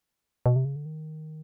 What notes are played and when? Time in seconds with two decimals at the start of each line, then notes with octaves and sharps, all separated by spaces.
0.46 B2
0.56 C3
0.65 C#3
0.76 D3
0.86 D#3